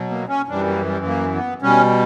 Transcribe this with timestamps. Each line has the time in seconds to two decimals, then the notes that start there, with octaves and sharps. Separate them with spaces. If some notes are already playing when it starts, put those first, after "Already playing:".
Already playing: B2 F#3
0.10 A#3
0.28 C#4
0.48 F#2 E3 G3 D4
0.67 A#3
0.86 G3
1.05 A#3
1.34 B3
1.62 B2 G3 C#4